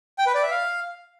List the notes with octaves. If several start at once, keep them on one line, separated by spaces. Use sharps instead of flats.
G5
B4
D5
E5
F5